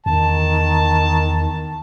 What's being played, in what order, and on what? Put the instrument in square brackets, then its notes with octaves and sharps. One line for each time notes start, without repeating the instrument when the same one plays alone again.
[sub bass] E2 [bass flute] D#3 [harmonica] A5